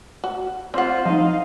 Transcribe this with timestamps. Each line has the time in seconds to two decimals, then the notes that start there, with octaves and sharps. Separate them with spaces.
0.24 F#4
0.74 C4 F4 C5 F#5
1.06 F3 D#4 D#5 F5